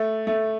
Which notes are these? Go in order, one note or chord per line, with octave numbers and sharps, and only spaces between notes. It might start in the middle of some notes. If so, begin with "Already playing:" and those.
Already playing: A3
A3